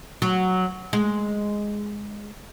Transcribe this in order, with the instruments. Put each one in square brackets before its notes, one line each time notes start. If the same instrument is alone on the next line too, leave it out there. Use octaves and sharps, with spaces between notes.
[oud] F#3
G#3